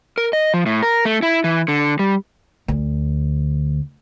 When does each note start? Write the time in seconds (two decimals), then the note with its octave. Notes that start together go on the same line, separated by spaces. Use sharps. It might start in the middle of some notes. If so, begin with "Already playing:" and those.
0.18 A#4
0.33 D#5
0.54 F3
0.66 A2
0.82 A#4
1.05 A3
1.22 E4
1.44 E3
1.68 D3
1.99 G3
2.68 D2